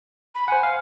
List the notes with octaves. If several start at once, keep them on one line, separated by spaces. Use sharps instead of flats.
B5
C5 F#5 G#5
F5